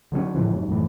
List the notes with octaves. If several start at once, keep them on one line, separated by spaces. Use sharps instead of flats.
D3 F#3 G#3 C#4
A2 D3 E3 F3
F2 G#2 F#3
F#2 A2 E3